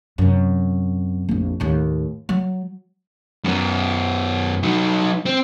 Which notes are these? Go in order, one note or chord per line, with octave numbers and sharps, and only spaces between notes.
F#2 C3
A#1 F2
D#2 A2
F#3
F#2 B3
F#3 D#4
C4